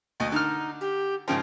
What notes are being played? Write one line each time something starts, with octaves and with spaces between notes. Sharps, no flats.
D2 D#5
D3 D#4 F6
G4
G#2 C#3 F3 G5